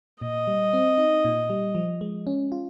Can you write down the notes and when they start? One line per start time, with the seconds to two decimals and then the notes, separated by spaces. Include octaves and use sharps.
0.21 A#2 D#5
0.47 G3
0.73 C4
0.98 D#4
1.25 A#2
1.50 G3
1.75 F3
2.01 G#3
2.27 C#4
2.52 F4